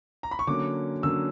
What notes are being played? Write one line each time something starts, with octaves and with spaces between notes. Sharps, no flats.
A#5
B5
C#6
D3 F#3 A#3 C#4 D6
D3 F#3 A#3 C#4 E6